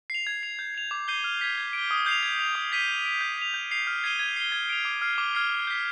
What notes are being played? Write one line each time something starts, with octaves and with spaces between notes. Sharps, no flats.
C7 F7
G#6
C7 F7
G6
C7 F7
D6
G6 C7 D#7 G7
F6
G#6 B6
G#6
D7
G7
D#6
G6 C7 F7
G#6
C7 F7
D#6
G#6 B6 D#7 G7
G6
D7 F7
G6
B6 F7
G6
C7 F7
F6
G#6 C7 D#7 G7
G#6
C7 G7
G#6
D7 F7
D6
F6 C7
D6
F6 G#6 C7
D6
G6 B6